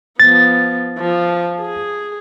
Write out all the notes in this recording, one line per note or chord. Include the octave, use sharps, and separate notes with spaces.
F3 B3 A6
F3
G#4